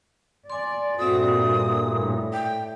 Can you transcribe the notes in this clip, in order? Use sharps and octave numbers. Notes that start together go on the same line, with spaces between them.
D5 G#5 C6
G2 A#2 C4 F#4 A4 D5 E5 D#6
A2
G5